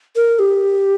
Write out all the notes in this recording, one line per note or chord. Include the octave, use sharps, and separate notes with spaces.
A#4
G4